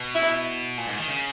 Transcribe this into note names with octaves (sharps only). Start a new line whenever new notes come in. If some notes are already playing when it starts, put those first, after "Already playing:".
Already playing: B2
E4
A#2
G#2
D#3
C#3